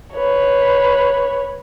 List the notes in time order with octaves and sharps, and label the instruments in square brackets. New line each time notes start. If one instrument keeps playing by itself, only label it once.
[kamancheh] B4 C#5